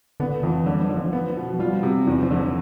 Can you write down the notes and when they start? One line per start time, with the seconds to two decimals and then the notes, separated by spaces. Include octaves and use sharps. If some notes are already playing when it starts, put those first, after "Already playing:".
0.20 D3 B3
0.43 F2 E3
0.66 D3 G3
0.81 F3
0.89 D3
0.97 F3
1.13 B3
1.37 B2
1.59 G3 F4
1.83 C3
2.07 E2
2.23 F3
2.30 D3
2.37 F3